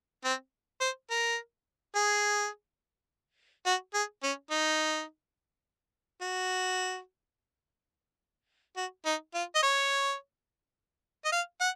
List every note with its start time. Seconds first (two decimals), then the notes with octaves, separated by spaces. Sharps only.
0.24 C4
0.81 C5
1.10 A#4
1.95 G#4
3.66 F#4
3.94 G#4
4.23 C#4
4.51 D#4
6.21 F#4
8.76 F#4
9.06 D#4
9.34 F4
9.55 D#5
9.62 C#5
11.25 D#5
11.32 F5
11.60 F#5